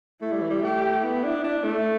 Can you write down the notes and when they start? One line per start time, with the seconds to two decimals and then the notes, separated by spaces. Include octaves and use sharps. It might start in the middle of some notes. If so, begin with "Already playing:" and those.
0.22 A3 E4
0.32 G3
0.41 E3
0.50 G3
0.62 A3 G4
1.03 B3 E4
1.24 D4
1.44 D4
1.64 A3